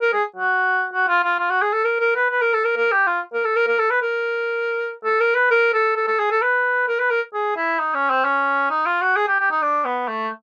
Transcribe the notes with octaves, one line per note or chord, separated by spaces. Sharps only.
A#4
G#4
F#4
F#4
F4
F4
F4
F#4
G#4
A4
A#4
A#4
B4
B4
A#4
A4
A#4
A#4
G4
F4
A#4
A4
A#4
A#4
A4
B4
A#4
A4
A#4
B4
A#4
A4
A4
A4
G#4
A4
B4
A#4
B4
A#4
G#4
E4
D#4
C#4
C4
C#4
D#4
F4
F#4
G#4
G4
G4
D#4
D4
B3
A3